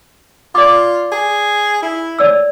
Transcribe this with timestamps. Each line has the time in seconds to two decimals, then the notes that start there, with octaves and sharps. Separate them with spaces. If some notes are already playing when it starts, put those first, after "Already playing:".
0.55 F4 D5 D6
1.12 G#4
1.83 E4
2.19 C#5 D5 E6